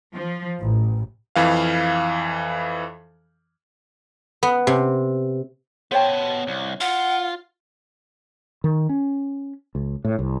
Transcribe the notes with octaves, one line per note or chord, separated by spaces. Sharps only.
F3
A1
F2 E3 F5
B3
C3
B3 C5 C#5 G5 A5
C2
F4 F#5
D#3
C#4
C#2
A2
C2